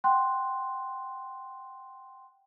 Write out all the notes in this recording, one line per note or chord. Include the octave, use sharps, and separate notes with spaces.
F#5 G5 C6 F#6